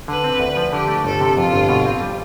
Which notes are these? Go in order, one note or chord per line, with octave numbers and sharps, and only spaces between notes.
D3 B4
C4
D2
F3
D3 G4
A3
G1 A4
C3
F2 F4
G1
B2
C4
G3